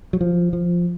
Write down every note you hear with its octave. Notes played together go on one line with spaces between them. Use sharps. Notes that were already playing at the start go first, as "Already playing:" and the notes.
F#3
F3
F3